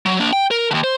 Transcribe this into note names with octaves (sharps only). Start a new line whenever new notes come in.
F#3
A#3 D4
G5
A#4
D#2 D3
C5